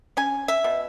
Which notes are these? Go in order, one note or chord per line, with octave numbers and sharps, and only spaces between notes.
C#4 G#5
E5
B2